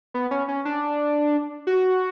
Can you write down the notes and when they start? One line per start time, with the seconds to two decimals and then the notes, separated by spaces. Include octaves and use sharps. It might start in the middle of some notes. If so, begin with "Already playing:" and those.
0.14 B3
0.31 C#4
0.48 C#4
0.65 D4
1.67 F#4